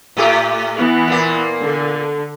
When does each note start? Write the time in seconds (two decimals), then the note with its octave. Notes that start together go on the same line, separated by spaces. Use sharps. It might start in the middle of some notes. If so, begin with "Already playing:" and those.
0.17 A2 A3 G4
0.76 E3 B3
1.08 A#2 A#3
1.61 D3